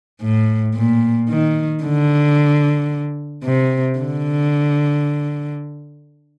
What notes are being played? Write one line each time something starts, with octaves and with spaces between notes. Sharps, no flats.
A2
A#2
D#3
D3
C3
D3